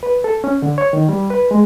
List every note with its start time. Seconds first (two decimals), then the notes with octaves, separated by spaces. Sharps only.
0.03 B4
0.24 A4
0.44 C#4
0.62 D3
0.78 C#5
0.93 D#3
1.09 G3
1.30 B4
1.51 G#3